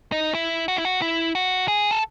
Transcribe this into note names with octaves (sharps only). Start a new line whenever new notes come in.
D#4
E4
F#4
E4
F#4
E4
F#4
G#4
A4